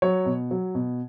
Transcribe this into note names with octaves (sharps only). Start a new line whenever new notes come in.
F#3 C#5
B2
F#3
B2